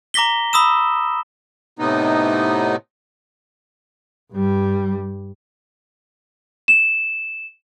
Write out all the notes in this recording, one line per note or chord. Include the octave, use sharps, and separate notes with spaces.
A#5 D6 A#6 B6 G7
B5 D#6 E6 E7
A2 C3 B3 D#4
G2 G3
E7